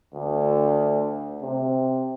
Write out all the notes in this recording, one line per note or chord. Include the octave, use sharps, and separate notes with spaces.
D2
C3